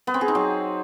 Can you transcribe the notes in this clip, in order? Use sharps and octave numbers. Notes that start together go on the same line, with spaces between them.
B3
C4
G#4
D#4
F#3